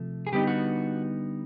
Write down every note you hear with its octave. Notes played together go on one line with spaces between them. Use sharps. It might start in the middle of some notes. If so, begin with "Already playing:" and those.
Already playing: C3 F3 A3
G#4
D3 G3 B3 D#4 G4
F#4